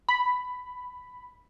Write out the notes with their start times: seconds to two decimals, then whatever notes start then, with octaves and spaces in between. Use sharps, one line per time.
0.09 B5